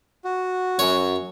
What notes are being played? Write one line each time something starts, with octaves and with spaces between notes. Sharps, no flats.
F#4
F#2 C#5